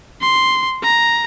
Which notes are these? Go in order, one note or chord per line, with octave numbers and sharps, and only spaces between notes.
C6
A#5